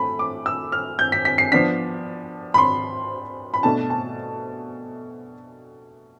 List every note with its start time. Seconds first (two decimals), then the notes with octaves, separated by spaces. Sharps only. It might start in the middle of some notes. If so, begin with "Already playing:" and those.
Already playing: A3 B5
0.19 D6
0.46 E6
0.72 F6
0.99 G6
1.12 B6
1.25 B6
1.38 C7
1.52 F3 B3 D4 B6
2.54 B5
2.58 C6
3.54 B5
3.63 B2 A3 D4 A5
3.90 A5